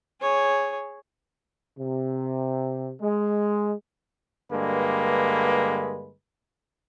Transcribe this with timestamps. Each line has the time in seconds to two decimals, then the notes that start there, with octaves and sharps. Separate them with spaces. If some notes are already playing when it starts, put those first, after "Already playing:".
0.21 G#4 C#5
1.78 C3
3.02 G#3
4.50 G2 D3 G#3 A#3 B4